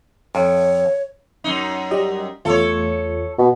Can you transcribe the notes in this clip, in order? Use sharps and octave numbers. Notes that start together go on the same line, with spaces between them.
F2 C#5
F#2 D#4
G3 G4 D#5
E2 A3 F4 A4 C#5
B2